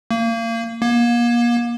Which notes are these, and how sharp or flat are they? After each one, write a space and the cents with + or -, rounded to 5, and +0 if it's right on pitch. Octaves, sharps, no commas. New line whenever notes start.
A#3 -30
A#3 +35